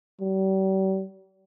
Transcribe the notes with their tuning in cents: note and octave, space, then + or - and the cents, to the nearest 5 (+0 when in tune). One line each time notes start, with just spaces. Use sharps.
G3 -40